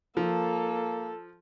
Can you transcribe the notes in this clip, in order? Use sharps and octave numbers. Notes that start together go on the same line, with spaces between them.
F3 A#3 A4